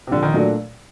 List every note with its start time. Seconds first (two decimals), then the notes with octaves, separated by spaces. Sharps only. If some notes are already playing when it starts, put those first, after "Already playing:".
0.07 C3
0.11 A#1 D3
0.23 D#3
0.34 A#2 F#3 A3 D4